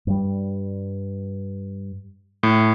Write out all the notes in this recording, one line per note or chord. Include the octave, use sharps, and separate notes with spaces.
G2 G3
A2